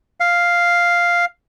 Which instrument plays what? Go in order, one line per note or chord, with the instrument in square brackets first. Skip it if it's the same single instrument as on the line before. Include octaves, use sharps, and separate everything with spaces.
[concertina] F5